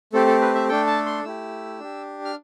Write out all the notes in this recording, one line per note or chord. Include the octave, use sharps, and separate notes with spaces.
A3 C4 G4 A4
A4
B4
E5
A3 D4 A4 G5
A5
C6
A3 E4 G4 E6
D4 G4
F6